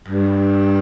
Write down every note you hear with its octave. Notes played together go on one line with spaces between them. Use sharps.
G2